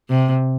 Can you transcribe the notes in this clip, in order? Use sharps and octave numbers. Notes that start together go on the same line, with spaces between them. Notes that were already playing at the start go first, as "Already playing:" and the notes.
C3